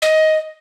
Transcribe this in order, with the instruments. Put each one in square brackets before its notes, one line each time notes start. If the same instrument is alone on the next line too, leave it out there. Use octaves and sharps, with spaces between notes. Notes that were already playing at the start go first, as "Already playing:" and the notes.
[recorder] D#5